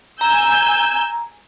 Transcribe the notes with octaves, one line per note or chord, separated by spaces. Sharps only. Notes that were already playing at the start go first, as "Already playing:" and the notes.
G#5 A#5 E6 G6